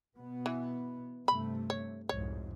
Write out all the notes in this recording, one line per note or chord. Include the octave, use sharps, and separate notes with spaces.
B2 B3
E3
G2 C3 A3 B5
C#5
C2 F2 G#2 C#5